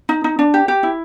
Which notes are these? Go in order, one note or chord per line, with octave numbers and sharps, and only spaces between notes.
D#4
D#4
D4
G4
G4
E4